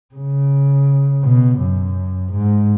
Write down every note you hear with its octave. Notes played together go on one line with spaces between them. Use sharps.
C#3
B2
F#2
G#2